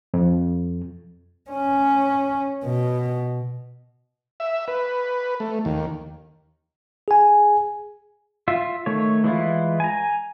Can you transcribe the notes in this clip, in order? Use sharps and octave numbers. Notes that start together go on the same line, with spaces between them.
F2
C#4
B2
E5
B4
A3
D#2
G#4 G#5
F4 E5
D#3 A3 C#5
E3 G#3 E4 F4
G#5 A#5